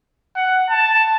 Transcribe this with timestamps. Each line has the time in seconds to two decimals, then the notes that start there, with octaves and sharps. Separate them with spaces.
0.36 F#5
0.70 A5